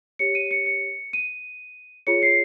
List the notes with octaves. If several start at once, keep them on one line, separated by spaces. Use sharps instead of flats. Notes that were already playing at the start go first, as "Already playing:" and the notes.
G4 C#5 C#7
D#7
C#7
C#7
D#7
F4 G#4 C#5 C#7
C7